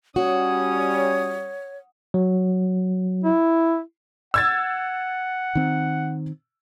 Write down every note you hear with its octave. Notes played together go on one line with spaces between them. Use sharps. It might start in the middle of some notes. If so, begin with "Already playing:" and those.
G3 C#4 F#4 C#5 D#6
F#3
E4
F#5 E6 G#6 A6
D#3 C4